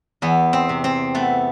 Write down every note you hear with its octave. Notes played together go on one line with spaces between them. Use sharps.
E2 B3
C4
C3
C4
A3 B3